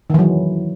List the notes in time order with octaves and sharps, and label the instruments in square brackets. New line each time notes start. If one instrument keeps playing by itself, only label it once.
[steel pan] D#3
E3
F#3